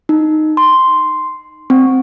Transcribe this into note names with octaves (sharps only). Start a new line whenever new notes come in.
D#4
C6
C4